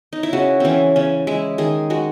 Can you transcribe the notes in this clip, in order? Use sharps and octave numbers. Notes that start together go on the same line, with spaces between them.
D#4
E4
C#3 F#4
E3 C4 C#4
C#3 C#4
G#3 E4
D#3 G#4
G#3 F#4